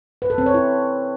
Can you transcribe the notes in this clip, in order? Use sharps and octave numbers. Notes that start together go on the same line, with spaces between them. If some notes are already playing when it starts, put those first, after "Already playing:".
B4
A4
C4
C#5
E4